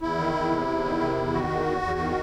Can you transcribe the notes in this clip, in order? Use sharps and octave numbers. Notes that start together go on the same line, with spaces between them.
E2 E4
D#3
E2
C3
E2
D#3
C3
E2
D#3 F#4
E2
E2
E2
D#3